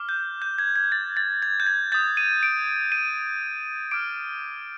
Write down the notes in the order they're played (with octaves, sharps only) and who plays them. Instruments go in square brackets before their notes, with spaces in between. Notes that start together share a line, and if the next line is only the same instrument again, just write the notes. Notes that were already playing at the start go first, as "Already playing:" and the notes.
Already playing: [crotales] D6 F6
G6
G6
G#6
G#6
A6
A6
G#6
G6
G#6
D#6 G6 A6
D#7
D7
D#7
D6 F6 D7